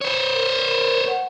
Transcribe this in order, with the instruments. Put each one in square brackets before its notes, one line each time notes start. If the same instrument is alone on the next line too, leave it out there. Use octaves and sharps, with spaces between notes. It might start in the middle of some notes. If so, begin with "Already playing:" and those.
[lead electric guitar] C5 C#5
[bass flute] A#4
F#5